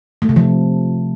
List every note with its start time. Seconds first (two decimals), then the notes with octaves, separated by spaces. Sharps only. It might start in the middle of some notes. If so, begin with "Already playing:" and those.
0.22 A3
0.29 C3
0.36 F3